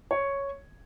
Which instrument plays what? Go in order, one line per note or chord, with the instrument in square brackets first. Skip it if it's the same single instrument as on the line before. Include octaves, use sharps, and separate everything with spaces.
[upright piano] C#5